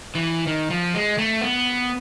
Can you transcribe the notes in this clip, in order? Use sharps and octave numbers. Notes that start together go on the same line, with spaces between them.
E3
D#3
F3
G#3
A3
B3